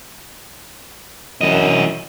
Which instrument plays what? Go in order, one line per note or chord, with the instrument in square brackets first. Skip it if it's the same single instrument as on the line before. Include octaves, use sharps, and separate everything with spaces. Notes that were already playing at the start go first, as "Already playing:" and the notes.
[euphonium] F#2 [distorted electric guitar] E3 D#5